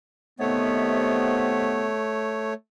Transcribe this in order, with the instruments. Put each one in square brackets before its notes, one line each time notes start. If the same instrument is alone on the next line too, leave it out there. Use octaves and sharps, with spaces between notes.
[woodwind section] C3 D#3 B3 [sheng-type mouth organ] A3 C#5